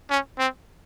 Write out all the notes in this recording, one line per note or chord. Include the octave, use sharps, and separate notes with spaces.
C#4
C4